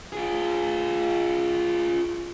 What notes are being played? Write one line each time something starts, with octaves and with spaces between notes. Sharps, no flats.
F4 G#4